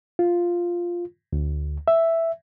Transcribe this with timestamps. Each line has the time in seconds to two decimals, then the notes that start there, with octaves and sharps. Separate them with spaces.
0.19 F4
1.33 D2
1.88 E5